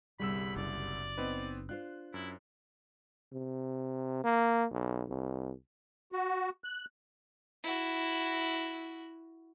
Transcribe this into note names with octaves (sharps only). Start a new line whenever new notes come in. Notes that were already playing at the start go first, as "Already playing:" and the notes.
G1 C2 G3 G#4 B5 E6
F#1 D5
B3 C4 D#4 B4
D4 F4 C5 F#6
F#2 E4
C3
A#3
B1
C2
F#4
F#6
E4 F#4